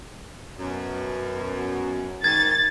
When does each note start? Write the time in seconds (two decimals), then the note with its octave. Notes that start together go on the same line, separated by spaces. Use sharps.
0.59 F#2 B2
2.24 G#2 D#3 G#6 A6